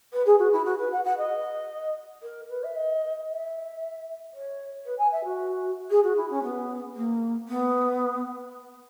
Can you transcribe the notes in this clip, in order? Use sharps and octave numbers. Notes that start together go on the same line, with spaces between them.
B4
G#4
F#4
E4
F#4
B4
F#5
F#5
D#5
A#4
B4
E5
D#5
E5
C#5
B4
G#5
E5
F#4
G#4
F#4
E4
C#4
B3
A#3
B3